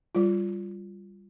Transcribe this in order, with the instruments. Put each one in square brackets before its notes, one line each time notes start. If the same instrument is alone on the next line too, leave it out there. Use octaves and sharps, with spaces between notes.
[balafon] G3 F4